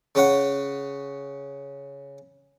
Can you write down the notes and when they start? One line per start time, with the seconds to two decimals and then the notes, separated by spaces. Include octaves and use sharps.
0.15 C#3 C#4 C#5 F#5